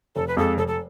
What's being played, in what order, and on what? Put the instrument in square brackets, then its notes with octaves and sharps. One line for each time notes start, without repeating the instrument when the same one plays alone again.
[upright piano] F1 [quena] A4
[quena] B4
[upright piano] F2 F3 G#3 [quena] A4
[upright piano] F1 [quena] A4
[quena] A4